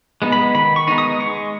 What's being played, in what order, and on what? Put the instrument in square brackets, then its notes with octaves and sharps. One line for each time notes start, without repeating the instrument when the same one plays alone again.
[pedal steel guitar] G#3 B3 D#4
B5
D#3 B5
C#6
G#3 B3 D#4
D#6
G#3 C#6